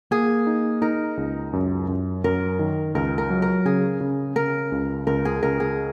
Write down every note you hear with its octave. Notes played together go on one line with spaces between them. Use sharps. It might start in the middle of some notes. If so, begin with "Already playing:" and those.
A#3 G#4
D#4
D#4 A#4
C#2
F#2
F#2
F#2 A#4
D#3
C#2 A#4
A#4
F#3
A#4
C#3 G#4
C#3
C#3 A#4
C#2
C#2 A#4
G#4
C#2 A#4
G#4